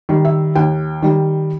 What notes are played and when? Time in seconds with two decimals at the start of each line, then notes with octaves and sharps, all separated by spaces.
0.09 D#3 G3
0.25 E5
0.55 D#2 G5
1.02 D#3 G3